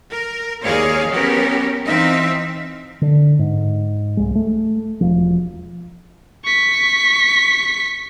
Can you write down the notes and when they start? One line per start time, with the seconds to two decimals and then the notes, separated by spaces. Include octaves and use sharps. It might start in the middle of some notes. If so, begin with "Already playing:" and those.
0.12 A#4
0.64 D#2 G#4 A#4 C#5 D5 F5
1.09 F#3 B3 C#4 F#4 G4 A#4
1.86 E3 C4 D#4 E5 F5
3.01 D3
3.39 G#2
4.17 C2 G#3
4.35 A3
5.01 E1 F3
6.45 C#6 B6